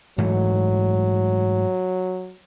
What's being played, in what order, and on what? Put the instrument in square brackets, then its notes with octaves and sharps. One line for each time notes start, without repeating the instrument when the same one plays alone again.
[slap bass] G#2 E3 A3 [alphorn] F#3